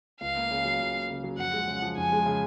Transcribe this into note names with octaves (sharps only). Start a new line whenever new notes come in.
C#2 F5
A#3
C#3
F#3
C#2
A#3
C#3
F#3
F2 F#5
G#3
C#3
F3
F2 G#5
G#3
C#3